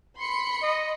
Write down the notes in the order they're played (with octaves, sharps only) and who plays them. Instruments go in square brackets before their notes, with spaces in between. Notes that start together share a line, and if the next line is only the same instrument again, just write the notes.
[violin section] B5 C6 C#7
[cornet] D#5